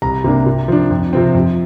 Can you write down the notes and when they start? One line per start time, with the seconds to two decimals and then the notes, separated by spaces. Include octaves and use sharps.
0.02 C2 A#5
0.24 C3 A#3 D4
0.46 C3
0.68 F3 D4
0.91 F2
1.13 C3 F3 C4
1.35 F2